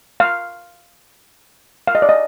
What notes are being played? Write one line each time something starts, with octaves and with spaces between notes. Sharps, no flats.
F5
F5
D#5
D5
D#5